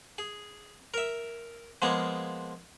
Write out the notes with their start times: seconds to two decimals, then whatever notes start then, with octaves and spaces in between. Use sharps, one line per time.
0.18 G#4
0.94 A#4 E5
1.82 F3 G#3 A#3 B3 G#4